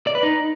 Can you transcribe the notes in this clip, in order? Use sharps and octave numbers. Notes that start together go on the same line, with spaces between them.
D5
B4
D#4